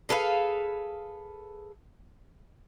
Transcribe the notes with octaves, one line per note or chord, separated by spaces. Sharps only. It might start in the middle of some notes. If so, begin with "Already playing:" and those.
G#4 A4 B4 F5